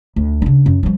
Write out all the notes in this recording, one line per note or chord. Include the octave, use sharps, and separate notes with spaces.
D2
C#3 D4
F#2
F3 G3